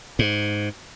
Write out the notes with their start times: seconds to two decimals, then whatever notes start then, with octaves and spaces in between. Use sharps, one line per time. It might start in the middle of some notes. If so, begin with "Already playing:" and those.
0.19 G#2